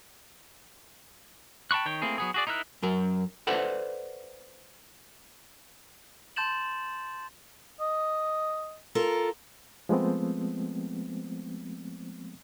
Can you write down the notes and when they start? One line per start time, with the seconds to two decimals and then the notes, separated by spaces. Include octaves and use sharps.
1.71 G5 A5 B5 C#6 F#6
1.86 D#3 C#5 G5
2.02 A3 A#3 C4 E4 G#4
2.18 F#3 B3 G#4
2.34 F#4 G#4 D5
2.47 D#4 E4 A#4 E5 F#6
2.83 F#2 F#3 A#4
3.47 A4 B4 C5 D5 E5 F#5
6.36 A5 C6 G6 A6 E7 F#7
7.81 D#5
8.95 F4 A4 A#4
9.89 F3 G#3 A3 B3 C4